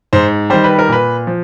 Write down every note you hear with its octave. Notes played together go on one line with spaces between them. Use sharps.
G#2 C5
D#3 G3 C5
B4
A#4
A#2 B4
F3